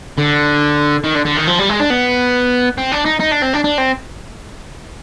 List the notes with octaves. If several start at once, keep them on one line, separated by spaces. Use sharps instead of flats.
D3
D#3
D3
D3
D#3
F3
G3
G#3
D4
B3
C4
D4
D#4
D#4
D4
C4
D4
D4
C4